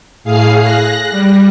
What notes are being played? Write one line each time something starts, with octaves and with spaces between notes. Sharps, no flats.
A2 G#4 F5 C7
F#6 A#6
G3